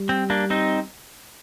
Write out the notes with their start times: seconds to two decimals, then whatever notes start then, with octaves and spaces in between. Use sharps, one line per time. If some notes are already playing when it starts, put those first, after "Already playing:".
Already playing: G3
0.09 C4
0.30 A#3 D4
0.50 C4 D#4